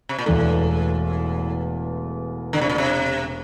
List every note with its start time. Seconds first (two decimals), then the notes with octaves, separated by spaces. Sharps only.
0.09 C3
0.19 A#2
0.26 E1 E2 A2 E3 A3
2.53 D3
2.61 C3
2.69 A#2
2.78 C3